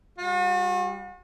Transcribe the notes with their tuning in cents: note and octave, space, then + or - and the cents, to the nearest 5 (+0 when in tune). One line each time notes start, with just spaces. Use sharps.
G3 +10 F#4 -40